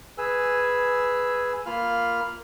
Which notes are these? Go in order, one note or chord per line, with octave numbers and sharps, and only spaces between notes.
G#4 B4 G#5 E6
A#3 F4 F5 B5 F6